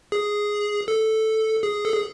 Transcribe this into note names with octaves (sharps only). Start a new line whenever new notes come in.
G#4
A4
G#4
A4
G#4